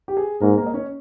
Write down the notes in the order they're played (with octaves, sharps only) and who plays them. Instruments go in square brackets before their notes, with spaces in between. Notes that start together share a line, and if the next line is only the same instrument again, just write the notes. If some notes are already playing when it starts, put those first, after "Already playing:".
[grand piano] G4
G#4
[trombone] G#2 [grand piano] A#3 A#4
[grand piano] A#3 A#4
D#5
C#4 C#5